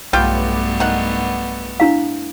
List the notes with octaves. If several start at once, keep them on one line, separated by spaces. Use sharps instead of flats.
B1 G2 A3 B3 F4 G4 B4 G5
D#3 F#5
D4 E4 F5